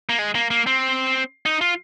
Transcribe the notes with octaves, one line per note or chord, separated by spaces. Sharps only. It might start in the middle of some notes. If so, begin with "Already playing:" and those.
A#3
G#3
A#3
A#3
C4
D#4
F4